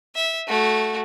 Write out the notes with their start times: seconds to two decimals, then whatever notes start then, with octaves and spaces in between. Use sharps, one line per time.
0.15 E5
0.47 A3 F#4